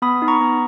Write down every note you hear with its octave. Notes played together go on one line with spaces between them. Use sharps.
B3 B5 D#6
D#4
A#5 C#6
B3